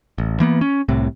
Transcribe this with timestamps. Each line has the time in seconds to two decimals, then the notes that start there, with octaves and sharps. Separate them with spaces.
0.18 A1
0.40 E3 A#3 B3
0.61 C#4
0.89 C2 A2 C3